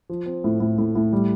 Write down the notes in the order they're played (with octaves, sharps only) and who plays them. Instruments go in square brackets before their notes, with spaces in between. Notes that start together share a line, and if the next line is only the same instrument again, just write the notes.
[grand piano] F3
C4
A2
A2
A2
A2
G3